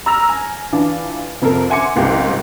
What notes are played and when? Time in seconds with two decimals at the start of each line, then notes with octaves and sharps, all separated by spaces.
0.06 A#5 E6 F6 A#6 F7
0.29 G#5
0.72 E3 D4 F4
1.42 F2 C3 A4 A#4
1.70 E5 F#5 G#5 C6 D6 C#7
1.96 F#1 C2 G#2 F4 G4 C6